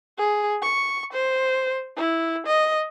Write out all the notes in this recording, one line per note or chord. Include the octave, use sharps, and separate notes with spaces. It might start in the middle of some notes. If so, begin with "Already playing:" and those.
G#4
C#6
C5
E4
D#5